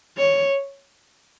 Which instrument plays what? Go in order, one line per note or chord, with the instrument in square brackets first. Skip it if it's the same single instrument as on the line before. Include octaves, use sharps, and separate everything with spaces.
[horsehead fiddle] C#5